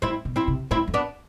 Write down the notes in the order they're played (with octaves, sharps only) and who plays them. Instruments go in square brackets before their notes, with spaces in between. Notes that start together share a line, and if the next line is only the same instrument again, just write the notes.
[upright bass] A2 [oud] C4 E4
[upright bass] B2
[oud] C4 E4
[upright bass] C3
[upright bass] A2 [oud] C4 E4
[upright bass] F2
[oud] B3 D4